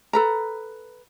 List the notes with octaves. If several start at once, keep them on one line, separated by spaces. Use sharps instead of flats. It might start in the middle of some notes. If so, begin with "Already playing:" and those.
A4 B4 A#5